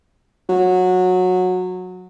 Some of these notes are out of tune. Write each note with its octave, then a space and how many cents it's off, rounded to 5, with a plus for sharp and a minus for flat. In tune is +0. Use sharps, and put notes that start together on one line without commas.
F#3 -15